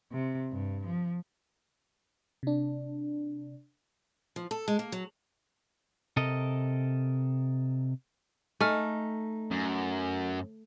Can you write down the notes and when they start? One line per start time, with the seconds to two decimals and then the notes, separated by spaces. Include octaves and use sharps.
0.12 C3
0.51 G2
0.86 F3
2.43 C3 D4
4.36 F3
4.51 A4
4.68 G#3
4.79 A#3
4.92 F#3
6.17 C3 A4 A#4 D#5
8.61 A3 D#4 G#5 F6
9.51 F#2